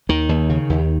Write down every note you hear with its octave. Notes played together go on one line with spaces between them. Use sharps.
D#2 D#3
D#2
C#3
D#2